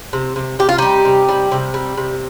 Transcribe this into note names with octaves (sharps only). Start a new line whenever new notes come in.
C3
C3
C3 G4
F4
G3 D#4 G4
C3
G3
C3
G3
C3